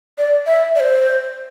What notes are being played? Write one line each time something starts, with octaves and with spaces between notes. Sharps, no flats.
D5
E5
D5
C5